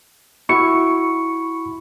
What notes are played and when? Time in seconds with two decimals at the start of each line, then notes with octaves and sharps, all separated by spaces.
0.49 E4 F#4 B5 C#6 C#7